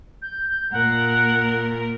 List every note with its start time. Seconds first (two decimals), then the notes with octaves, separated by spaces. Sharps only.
0.22 G6
0.72 A#2 A#4 F#5